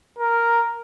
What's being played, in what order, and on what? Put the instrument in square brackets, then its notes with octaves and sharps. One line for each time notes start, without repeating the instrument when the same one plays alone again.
[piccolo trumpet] A#4